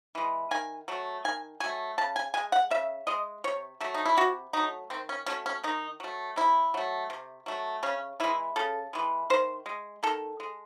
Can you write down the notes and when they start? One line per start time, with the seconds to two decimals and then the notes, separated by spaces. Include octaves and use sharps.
0.15 E3 G#3
0.51 D#3 G#5
0.88 F#3 A3
1.25 D#3 G#5
1.60 F#3 G#5
1.66 A3
1.98 C#3 A5
2.16 G#5
2.34 G#3 G#5
2.52 F#5
2.70 C#3 E5
3.07 G#3 D#5
3.44 C3 C#5
3.81 F#3 A3 E5
3.94 D#4
4.05 E4
4.17 C3 F#4
4.53 F#3 A3 D#4
4.90 D#3 C4
5.09 C#4
5.26 F#3 A3 C#4
5.46 C#4
5.63 D#3 D#4
6.00 F#3 A3
6.36 C3 E4
6.74 F#3 A3
7.10 C3
7.46 F#3 A3
7.83 C#3 C#4
8.20 E3 G#3 E4
8.56 C#3 A4
8.93 E3 G#3
9.30 D#3 C5
9.66 G#3
10.03 D#3 A4
10.40 G#3